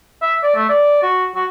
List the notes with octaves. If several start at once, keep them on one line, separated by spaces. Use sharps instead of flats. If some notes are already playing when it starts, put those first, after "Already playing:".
E5
D5
A3
D5
F#4
F#4